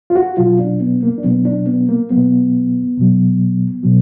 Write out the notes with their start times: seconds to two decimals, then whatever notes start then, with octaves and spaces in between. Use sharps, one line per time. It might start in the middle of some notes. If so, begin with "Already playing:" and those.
0.10 F4
0.16 F#4
0.37 B2 F#3 F4
0.59 D4
0.80 B3
1.03 A#3
1.18 D4
1.24 B2 F#3 B3
1.45 D4
1.66 B3
1.89 A#3
2.11 B2 F#3 B3
2.97 B2 F#3
3.83 B2 F#3